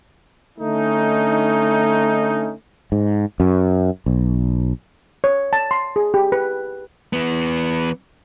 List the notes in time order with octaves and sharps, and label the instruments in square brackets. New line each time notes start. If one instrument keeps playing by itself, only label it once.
[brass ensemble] D3 A3 C#4 D#4
[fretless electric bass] G#2
F#2
B1
[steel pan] C#5
A5
C6
G#4
G4
B4
[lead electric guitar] E3 B3